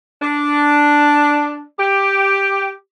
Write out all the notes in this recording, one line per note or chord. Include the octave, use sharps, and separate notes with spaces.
D4
G4